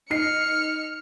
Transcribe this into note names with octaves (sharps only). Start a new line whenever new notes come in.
D#4 F6 C7 C#7